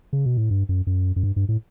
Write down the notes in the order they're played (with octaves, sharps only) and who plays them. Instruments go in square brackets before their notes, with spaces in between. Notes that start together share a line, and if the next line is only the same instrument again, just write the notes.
[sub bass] C#3
B2
A2
G2
F#2
F#2
F#2
G2
G2
A2